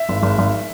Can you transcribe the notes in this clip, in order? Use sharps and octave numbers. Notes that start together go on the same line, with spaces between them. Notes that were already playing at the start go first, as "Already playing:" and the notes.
Already playing: E5
G#1
G#1
G#1